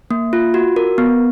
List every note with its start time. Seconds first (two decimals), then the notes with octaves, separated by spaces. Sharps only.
0.11 A#3
0.33 F4
0.54 F#4
0.76 A#4
0.98 B3